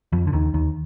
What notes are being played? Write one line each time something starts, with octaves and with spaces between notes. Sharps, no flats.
F2 F3
D3
D#2 D#3
D#2 D#3